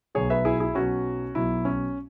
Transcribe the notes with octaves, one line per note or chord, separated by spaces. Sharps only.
B1 B2 F#3 G#4 C#5
B4 E5
E4 G#4
E4 G#4
B1 B2 F#3 C#4 F#4
B1 B2 F#3 E4
C#4